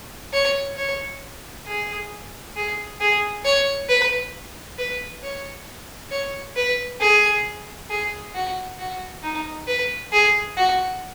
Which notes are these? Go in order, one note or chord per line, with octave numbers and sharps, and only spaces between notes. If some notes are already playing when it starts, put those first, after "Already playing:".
C#5
C#5
G#4
G#4
G#4
C#5
B4
B4
C#5
C#5
B4
G#4
G#4
F#4
F#4
D#4
B4
G#4
F#4